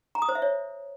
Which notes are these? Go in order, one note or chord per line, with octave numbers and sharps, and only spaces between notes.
A#5
D#6
C5
E5
C#5